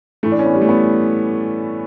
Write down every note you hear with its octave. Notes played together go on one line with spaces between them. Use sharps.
A2 E3 A3
D4
C#4
B3
G3
A3
B3